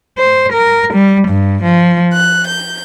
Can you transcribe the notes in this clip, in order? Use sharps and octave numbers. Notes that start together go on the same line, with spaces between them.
C5
A#4
G3
G2
F3
F#6
G6